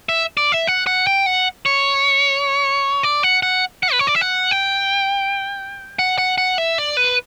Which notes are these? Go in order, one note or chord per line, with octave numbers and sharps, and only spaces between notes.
E5
D5
E5
F#5
F#5
G5
F#5
C#5
D5
F#5
F#5
F#5
B4
C#5
D5
E5
F#5
G5
F#5
F#5
F#5
E5
D5
B4